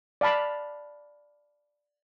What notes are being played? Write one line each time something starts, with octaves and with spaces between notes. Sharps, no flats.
D5 F5 A5 B5